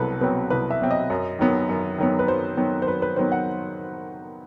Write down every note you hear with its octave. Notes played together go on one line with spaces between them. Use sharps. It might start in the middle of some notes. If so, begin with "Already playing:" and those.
Already playing: C2 B2 F#3 C4 A4 B4
B2 F#3 C4 B4
C2 B4
E5
B2 F#3 C4
D#5
F#2
D#3 F#3 B3
F#2
D#3 F#3 B3
B4
F#2 C5
D#3 F#3 B3
C5
F#2 B4
B4
D#3 F#3 B3 C5
F#5